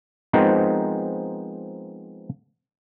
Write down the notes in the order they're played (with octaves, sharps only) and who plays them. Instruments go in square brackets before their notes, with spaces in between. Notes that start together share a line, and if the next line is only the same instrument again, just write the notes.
[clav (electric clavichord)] F3 G#3 B3 C4 D#4 A#4